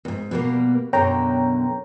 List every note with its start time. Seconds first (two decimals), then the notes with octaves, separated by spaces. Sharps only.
0.05 E2 G#2
0.31 B2 G3 A#3
0.93 F#2 B2 D3 C#5 G5 A#5